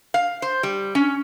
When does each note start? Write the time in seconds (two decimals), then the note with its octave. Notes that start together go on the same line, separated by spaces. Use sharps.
0.14 F5
0.42 C5
0.63 G3
0.95 C#4